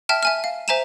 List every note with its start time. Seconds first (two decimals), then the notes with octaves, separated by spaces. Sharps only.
0.09 E5 G5 A5 F6
0.23 E5 G#5 F6
0.44 F5
0.68 C5 E5 G#5 A#5 D#7 E7